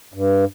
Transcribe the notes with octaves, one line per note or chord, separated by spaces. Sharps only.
G2